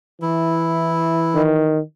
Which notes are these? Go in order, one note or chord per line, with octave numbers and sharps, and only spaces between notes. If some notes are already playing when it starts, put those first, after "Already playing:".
E3 E4
D#3